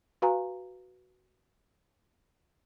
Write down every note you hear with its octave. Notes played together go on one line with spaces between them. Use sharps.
F#4 B4 F5 G#5 A#5